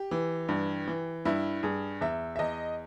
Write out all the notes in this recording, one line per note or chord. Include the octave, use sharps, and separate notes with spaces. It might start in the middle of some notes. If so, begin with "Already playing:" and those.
Already playing: G4
E3
G2
E3
G2 E4
G2 G#4
E2 E5
E5
E2 D#5